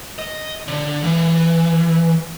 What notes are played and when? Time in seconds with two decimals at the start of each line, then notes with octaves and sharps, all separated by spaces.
0.19 D#5
0.68 D3
1.04 E3